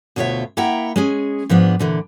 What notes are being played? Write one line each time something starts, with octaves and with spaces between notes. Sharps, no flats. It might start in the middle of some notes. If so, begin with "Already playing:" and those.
D2 B2 D4 F4 C#5 E5
A#3 E4 E5 F#5 G5 A#5
G#3 C#4 G#4
G#2 F3 B3 D4
A#2 D3 E3